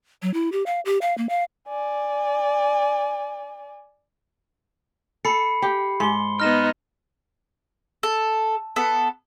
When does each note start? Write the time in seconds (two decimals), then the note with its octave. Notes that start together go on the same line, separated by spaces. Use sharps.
0.22 F#3
0.34 E4
0.52 G4
0.66 F5
0.85 G4
1.02 F5
1.18 A#3
1.29 F5
1.68 D5 G#5
5.25 A4 B5 C7 C#7
5.62 G4
6.00 G#2 C6 G7
6.40 B3 D#4 F6 A#6 E7
8.03 A4
8.76 B3 A4